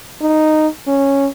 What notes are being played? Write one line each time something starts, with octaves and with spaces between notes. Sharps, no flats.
D#4
C#4